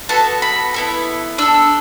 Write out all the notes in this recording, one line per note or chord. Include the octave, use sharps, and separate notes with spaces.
B3 F#4 A4 A5
B5
B3 E4 A4
D4 A4 E6